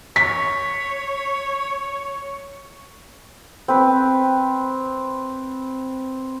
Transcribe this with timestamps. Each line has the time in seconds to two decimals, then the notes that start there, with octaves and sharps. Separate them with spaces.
0.16 C#5 B6
3.68 C4 B4